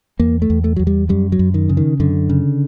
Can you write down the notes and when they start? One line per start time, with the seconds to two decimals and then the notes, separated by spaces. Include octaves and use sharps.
0.19 E2 A#3
0.42 A3
0.50 E2
0.64 A3
0.76 E2 F#3
0.87 G3
1.09 F#2 G3
1.32 F#3
1.39 F#2
1.54 D#3
1.69 C#3
1.77 D#3
2.00 F#2 D3
2.29 C#3